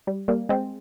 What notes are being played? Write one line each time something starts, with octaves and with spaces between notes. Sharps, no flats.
G3
G3 A#3
G#3 C4